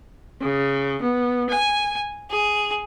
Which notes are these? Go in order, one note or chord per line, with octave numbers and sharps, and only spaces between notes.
C#3
B3
G#5
G#4